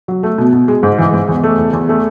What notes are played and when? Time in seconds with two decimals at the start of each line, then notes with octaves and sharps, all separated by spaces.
0.08 F#3
0.23 A3
0.38 B2
0.53 B2
0.68 G#3
0.83 G#2
0.98 E3
1.13 G#2
1.28 E2
1.43 A3
1.58 E2
1.73 E2
1.89 A3